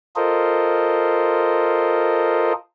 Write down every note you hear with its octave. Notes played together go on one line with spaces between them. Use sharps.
F4 A4 A#4 C5 D#5